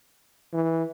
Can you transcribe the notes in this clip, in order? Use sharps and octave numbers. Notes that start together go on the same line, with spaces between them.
E3